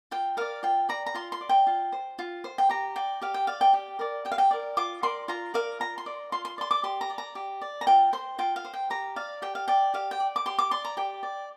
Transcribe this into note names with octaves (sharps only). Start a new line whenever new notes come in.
F4 G5
A#4 D5 F5
F4 G5
D5 A#5
A#5
F4 C6
C6
D5
G5
F4
C5
F4
C5
G5
G4 A#5
D5 G5
G4 F5
G5
D5 F5
G5
G4
A#4 D5
G4 G5
F5
G5
A#4 D5
F4 D6
A#4 D5 C6
F4 A#5
A#4 D5 F5
F4 A#5
C6
D5
F4 C6
C6
D5 C6
D6
G4 C6
A#5
D5
A#5
G4
D5
A#5
F4 G5
C5 C6
F4 G5
F5
C5
G5
G4 A#5
D5 F5
G4 G5
F5
D5 G5
G4 F5
G5
D5
D6
G4 C6
D6
D5 C6
A#5
G4 G5
D5